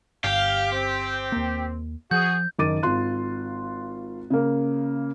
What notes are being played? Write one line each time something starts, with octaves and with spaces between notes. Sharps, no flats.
G1 G4 F5
C4
D#2 A#3
F3 F#4 G#4 G6
F#1 D#3 D6 A6 D#7
G#1 F4 C6 F#6
C#3 A#3